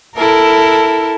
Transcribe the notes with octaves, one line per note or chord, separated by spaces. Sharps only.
E4 A4 A#4